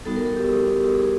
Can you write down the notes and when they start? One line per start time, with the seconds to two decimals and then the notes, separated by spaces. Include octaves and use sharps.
0.05 G3 B3 D#4 F#4 A4
0.16 A#4
0.26 A4
0.36 G4
0.52 G4
0.97 G#4